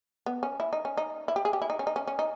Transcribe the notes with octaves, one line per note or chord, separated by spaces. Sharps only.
B3
C#4
E4
D#4
C#4
D#4
E4
G4
G#4
G4
E4
D#4
C#4
D#4
C#4
C#4
D#4